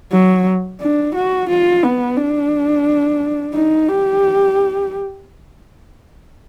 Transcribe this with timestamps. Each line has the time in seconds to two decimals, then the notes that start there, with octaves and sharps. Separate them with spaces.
0.12 F#3
0.81 D4
1.15 F#4
1.49 F4
1.83 B3
2.18 D4
3.54 D#4
3.88 G4